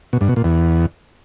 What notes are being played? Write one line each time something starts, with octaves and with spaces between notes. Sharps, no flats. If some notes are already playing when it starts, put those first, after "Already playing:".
B2
G2
B2
A#2
E2